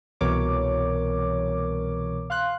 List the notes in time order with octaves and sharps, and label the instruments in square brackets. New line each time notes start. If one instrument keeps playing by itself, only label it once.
[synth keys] C2 B2 E3 A#4 C#5 D6
F5 C6 F#6